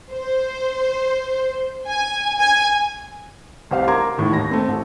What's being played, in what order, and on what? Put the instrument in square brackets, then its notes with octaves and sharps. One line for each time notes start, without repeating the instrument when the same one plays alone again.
[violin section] C5
G#5
G#5
[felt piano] C2 G4 C5 F5
A#4 A#5 C6 D6 G#6
E2 A2 D#3
D#2 B5 A#6
A3 C4
A1